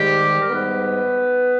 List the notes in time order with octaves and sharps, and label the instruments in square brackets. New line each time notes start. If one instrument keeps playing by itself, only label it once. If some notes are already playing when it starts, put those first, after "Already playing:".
Already playing: [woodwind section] G#2 D#3 G3 G#3 G4
A#4
G#2 G3 B3 B4